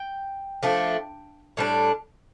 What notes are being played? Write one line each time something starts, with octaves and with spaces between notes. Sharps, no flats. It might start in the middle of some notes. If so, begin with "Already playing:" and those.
Already playing: G5
F3 A3 D4
A2 G3 D4